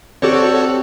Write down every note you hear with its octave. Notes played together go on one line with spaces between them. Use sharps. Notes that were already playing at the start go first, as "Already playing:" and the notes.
C4 F#4 G4 A4 C#5 D5